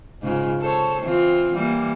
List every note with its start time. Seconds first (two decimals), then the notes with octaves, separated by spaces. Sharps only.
0.22 G#2 C#3 F4
0.61 A4 C5 C#5
1.02 E3 C4 F4
1.53 E3 G3 A#3